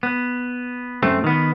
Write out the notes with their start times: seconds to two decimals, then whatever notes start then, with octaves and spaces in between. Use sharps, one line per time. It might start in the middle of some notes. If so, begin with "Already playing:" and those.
0.03 B3
1.03 F#2 A3 C4
1.24 D#3 B3